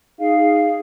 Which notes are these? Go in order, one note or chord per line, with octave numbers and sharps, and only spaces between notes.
D#4 G#4 F5